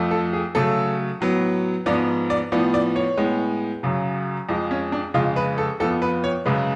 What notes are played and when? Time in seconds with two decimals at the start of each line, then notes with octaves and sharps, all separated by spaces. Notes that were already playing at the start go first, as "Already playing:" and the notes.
Already playing: F2 F3 A3
0.11 A4
0.33 G#4
0.55 C#3 F#3 A3 A4
1.20 A2 F#3 B3
1.86 G#2 F3 B3 D5
2.30 D5
2.52 A2 F3 B3 D5
2.74 D5
2.96 C#5
3.17 A2 G#3 B3
3.83 F#2 C#3 F#3
4.49 F2 F3 G#3
4.71 C#4
4.92 D4
5.14 F2 C#3 G#3 F4
5.36 B4
5.58 A4
5.80 F2 F3 B3 A4
6.02 B4
6.24 C#5
6.45 F#2 C#3 G#3 B4